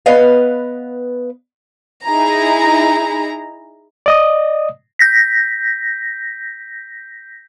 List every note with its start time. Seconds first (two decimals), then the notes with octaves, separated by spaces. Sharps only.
0.06 B3 B4 D#5 F5
2.06 D#4 E4 G#4 A#5
4.06 D5 D#5 D#6
4.99 G6 A#6 B6